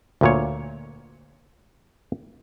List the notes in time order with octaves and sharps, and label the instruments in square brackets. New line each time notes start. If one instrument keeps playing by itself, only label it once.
[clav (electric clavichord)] D2 A#2 C#5